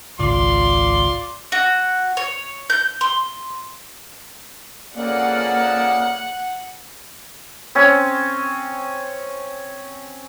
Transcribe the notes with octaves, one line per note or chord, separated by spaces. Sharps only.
G#1 C#2 F4 D5 C6
F#4
C#5
G6
C6
F2 C#3 A#3 D5 F#5
C4 C#4